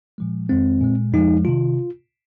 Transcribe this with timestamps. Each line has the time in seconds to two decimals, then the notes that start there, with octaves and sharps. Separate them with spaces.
0.18 A#2 F3 G#3
0.49 F2 D#3 G#3 C4
0.81 A#2 G#3
1.13 F2 F3 G#3 D#4
1.45 C3 D#3 F4